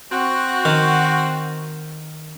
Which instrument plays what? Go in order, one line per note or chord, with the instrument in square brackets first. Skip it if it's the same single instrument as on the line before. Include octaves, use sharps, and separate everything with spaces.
[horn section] C4 F#4
[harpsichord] D#3